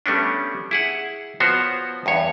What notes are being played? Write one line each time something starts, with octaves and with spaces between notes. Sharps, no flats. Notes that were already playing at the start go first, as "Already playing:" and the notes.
G3 A3 B3 C#4 D4
E4 G#4 F#5
F3 B3 F#4 C5 C#5
E2 G2 C#5